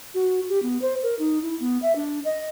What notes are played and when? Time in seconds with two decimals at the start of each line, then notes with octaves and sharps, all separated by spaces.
0.14 F#4
0.49 G4
0.62 B3
0.81 C5
1.03 A#4
1.19 D#4
1.42 E4
1.60 B3
1.82 E5
1.96 D4
2.25 D#5